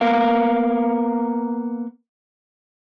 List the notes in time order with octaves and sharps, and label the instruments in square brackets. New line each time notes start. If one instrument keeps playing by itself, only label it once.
[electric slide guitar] A#3 B3 A#4 F5